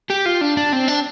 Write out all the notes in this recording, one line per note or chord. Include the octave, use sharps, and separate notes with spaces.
G4
F4
D4
D4
C4
D4